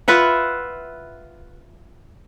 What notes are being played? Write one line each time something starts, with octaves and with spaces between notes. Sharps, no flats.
F4 B4 E5 F#5